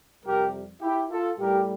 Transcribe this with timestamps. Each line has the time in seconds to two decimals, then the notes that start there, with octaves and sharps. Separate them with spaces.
0.25 F2 C3 G3 G4 A#4
0.82 E4 G4
1.11 F4 A4
1.39 A2 G3 G4 A#4